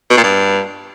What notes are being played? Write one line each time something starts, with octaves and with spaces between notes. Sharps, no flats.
B2
A#2
G2